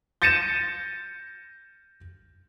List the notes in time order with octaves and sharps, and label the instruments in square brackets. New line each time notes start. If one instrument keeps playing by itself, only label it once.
[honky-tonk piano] G6 A6 A#6 C#7 D#7 E7